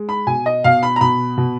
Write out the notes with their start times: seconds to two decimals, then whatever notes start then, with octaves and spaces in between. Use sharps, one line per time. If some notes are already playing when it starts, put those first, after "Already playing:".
Already playing: G#3
0.09 B5
0.27 B2 G#5
0.46 D#5
0.64 B2 F5
0.83 B5
0.96 A#5
1.01 B2 B5
1.38 B2